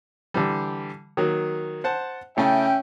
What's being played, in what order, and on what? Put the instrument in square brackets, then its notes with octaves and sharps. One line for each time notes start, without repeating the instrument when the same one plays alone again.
[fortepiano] D3 E3 G3
D#3 F#3 A#3
C5 F#5 A5
[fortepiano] C#3 A3 E4 [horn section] C#4 E5 G5